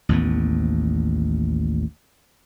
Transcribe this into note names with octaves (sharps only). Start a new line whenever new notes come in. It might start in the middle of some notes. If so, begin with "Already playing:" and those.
A1 D#2 A2 B3